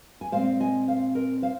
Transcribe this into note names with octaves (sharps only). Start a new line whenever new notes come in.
G#5
A#2 G#3 C4 C5 F5
D#5 G#5
C5 F5
A#4 D#5
C5 F5